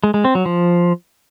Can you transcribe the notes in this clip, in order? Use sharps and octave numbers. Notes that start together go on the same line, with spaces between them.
G#3
G#3
C4
F#3
F3